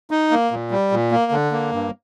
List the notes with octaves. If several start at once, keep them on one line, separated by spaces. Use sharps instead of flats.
D#4
A#3
A#2
G3
A#2
A#3
D3
A#3
G2